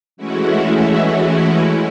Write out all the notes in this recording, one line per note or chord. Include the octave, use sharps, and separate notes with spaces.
E3 G#3 A3 C#4 E4 F#4